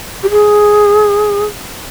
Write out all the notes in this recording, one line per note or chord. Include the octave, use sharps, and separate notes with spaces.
G4
G#4